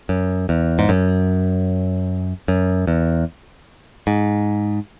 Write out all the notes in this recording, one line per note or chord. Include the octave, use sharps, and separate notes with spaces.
F#2
E2
G#2
F#2
F#2
E2
G#2